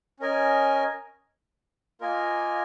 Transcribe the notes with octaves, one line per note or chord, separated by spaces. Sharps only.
C#4 A#4 D#5 G#5
A#3 F4 A#4 D#5 G#5